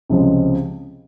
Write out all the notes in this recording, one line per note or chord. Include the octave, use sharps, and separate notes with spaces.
C#2 C3 F3 G#3 C#4